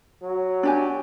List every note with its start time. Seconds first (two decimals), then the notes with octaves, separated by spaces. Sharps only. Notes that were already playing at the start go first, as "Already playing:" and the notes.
0.22 F#3
0.63 D4 G4 G#5